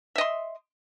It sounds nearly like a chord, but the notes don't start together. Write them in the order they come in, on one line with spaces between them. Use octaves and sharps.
E5 D#5 C6